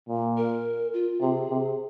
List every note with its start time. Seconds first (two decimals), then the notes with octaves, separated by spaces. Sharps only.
0.09 A#2
0.37 A#4
0.93 F4
1.21 C3 G#4
1.50 C3